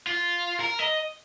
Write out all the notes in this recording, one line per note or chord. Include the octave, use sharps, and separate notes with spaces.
F4
A#4
D#5